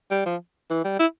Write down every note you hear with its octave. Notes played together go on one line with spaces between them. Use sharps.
G3
F3
E3
G3
E4